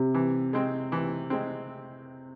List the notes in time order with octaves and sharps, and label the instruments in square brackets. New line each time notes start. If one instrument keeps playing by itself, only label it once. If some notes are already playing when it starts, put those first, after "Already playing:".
Already playing: [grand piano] C3
[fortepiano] E3
G#3 C4
E3
G#3 C4